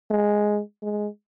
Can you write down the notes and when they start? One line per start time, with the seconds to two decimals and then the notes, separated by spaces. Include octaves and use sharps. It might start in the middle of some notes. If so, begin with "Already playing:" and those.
0.10 G#3
0.82 G#3